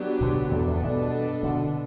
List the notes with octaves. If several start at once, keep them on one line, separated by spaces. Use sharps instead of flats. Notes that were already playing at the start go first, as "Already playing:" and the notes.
Already playing: F#3 B3 D4 G4
B2 D3
E2 G2 B3 D4 A4
E2
G2 B2
B2 D3